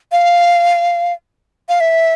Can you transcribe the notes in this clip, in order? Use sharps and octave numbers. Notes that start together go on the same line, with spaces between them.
F5
F5
E5